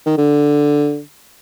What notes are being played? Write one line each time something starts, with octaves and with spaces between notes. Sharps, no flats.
D#3
D3